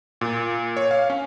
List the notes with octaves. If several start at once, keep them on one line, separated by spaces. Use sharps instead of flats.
A#2
C#5
F5
C#4